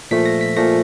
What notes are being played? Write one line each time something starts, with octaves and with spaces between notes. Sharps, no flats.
A#2 F3 A3 B6
A#6
B6
A#2 F3 A3 A#6